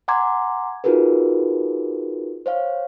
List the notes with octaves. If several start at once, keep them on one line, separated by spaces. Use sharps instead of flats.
F#5 G#5 A#5 C6 D6 G#6
D#4 F4 F#4 G#4 A#4 B4
C5 C#5 F5